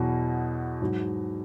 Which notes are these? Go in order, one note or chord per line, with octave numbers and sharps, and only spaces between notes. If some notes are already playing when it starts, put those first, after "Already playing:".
Already playing: E2 B2 F#3
G#2 F#3